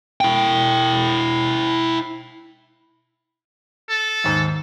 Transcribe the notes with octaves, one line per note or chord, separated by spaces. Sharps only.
E4 G5
A4
D#2 G#2